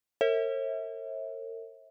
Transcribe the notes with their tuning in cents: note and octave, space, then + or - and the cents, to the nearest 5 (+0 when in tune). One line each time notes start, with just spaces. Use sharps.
A#4 -40 C#5 -45 E5 -25